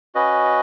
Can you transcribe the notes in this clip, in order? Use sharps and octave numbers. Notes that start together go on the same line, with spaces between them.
C#4 F#4 B4 D#5